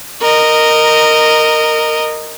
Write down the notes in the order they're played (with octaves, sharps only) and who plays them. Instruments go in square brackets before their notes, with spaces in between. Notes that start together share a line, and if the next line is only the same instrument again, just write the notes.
[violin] A#4 D#5